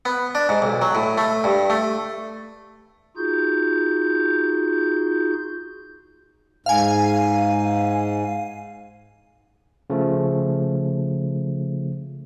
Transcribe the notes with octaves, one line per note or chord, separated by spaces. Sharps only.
B3
D4
G#2
B1
F#3
A2
A3
G2
A3
D#4 F4 F#4 G#4 G6
G#2 F5 G#5
C#3 F3 A3